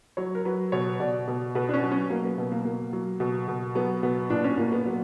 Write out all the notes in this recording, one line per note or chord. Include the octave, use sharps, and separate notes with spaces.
F#3 C#5
A#4
F#3 B4
B2 C#5
B2 D5
B2
B2 B4
D4
C#4
F#3
C#4
F#3 A#3
B3
B2 B3
A#3
B2 A#3
F#3
B2
B2
F#3 B3
B2 B3
A#2 D4
C#4
A#2 A#3
B3
F#3 B3